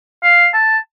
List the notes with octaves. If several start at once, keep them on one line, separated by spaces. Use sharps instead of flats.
F5
A5